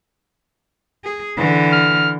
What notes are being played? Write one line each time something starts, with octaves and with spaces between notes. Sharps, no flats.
G#4
D3 E3
F6